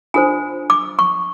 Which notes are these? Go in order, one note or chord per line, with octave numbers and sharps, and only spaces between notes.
D4 F4 A4 C5 G#5
D6
C#6